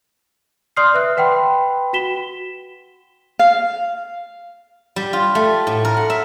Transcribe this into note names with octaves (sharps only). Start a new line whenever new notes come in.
D5 C6 D#6 F6 C7
B4 E5 F#6
B4 F#5 G5 B5 C6
F#4 B6 E7 G7
F5
G3
F4
A3
A2
A#4
F#5
E5